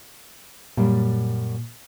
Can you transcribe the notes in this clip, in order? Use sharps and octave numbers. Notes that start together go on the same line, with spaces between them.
F#2 A#2 G3